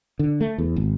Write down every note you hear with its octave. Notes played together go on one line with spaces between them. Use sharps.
D3
A3
E2
G#1